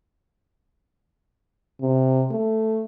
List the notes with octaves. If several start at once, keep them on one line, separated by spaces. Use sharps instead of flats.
C3
A3